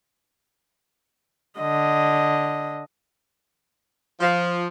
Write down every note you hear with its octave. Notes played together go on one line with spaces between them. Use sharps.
D3 D#5
F3